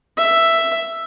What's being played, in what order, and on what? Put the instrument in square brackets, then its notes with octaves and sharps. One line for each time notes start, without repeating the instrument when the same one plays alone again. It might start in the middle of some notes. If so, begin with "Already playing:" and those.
[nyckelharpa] E5